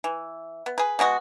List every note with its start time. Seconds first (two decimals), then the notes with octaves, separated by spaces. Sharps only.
0.04 E3
0.66 B3
0.78 G#4 B4
0.99 B2 G#3 F#4 D#5